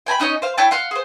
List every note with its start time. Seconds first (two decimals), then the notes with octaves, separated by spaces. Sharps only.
0.06 G5 G#5 A#5 B5
0.20 C#4 D#4 C#5 D#5
0.42 C5 F5
0.57 E4 C#5 G5 A5
0.71 F5 F#5 C6 F6
0.91 G#4 C5